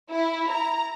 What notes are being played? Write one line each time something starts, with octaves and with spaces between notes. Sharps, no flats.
E4
A#5